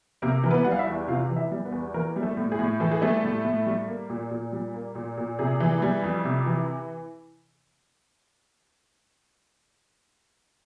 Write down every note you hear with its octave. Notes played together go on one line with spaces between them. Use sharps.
C3 A#3 A#4
E3 A#4
B3 B4
G3 F#5
F5
E4 E5
E2
C3 F4 F5
E3
E4 E5
G3
B3 B4
E2
E3 A#3 A#4
G3
A3 A4
A2
G#4
A2
E3 A4
G#4
G3 A3 A4
A2
A2
G3
A#3
A#2
A#2
G3
A#3
A#2
A#2
C3 G#4
E3
G3
F2
C3
E3